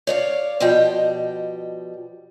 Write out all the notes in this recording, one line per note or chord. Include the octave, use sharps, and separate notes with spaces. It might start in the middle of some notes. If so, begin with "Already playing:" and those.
C#5 D5 F5
B2 F3 G3 D#5 G5